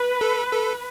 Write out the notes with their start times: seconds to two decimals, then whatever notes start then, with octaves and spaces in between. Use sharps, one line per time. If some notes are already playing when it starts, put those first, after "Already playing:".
Already playing: B4
0.21 A4
0.52 A4